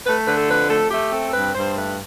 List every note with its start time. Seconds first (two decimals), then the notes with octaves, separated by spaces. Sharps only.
0.06 A3 B4
0.27 D3 B4
0.38 A4
0.48 F2 B4
0.69 A3 A4
0.91 A3 G4
1.12 C4 A4
1.34 G2 B4
1.55 G2 C5
1.77 A3 B4